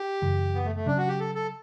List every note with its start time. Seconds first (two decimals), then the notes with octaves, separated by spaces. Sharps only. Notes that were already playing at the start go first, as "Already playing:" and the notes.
Already playing: G4
0.22 F#2 C#3 E3
0.55 B3
0.65 A3
0.76 A3
0.86 C#3 F#3 C#4 D4
0.98 F#4
1.08 G4
1.20 A4
1.35 A4